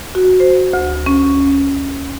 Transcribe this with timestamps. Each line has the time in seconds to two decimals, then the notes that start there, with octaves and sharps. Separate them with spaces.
0.15 F#4
0.40 C5
0.73 D2
1.06 C#4